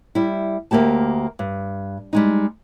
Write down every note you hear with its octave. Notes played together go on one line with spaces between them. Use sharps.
G3 E4
D2 G#2 A#3 G4 A5
G2
G3 G#3 D#4